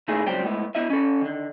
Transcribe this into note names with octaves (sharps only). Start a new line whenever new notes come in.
A#2 D#3 A3 D#4 E4 G#4
C#2 A#2 F#3 G3 C4 G5
A2 G#3 B3 E4
B3 E4 D#5 E5
C#4 A4
D3 D#3